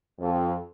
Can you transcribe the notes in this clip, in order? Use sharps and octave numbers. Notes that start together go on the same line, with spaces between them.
F2